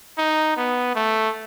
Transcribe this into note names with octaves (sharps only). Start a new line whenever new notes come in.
D#4
B3
A3